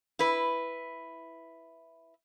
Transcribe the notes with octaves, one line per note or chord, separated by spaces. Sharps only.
E4 B4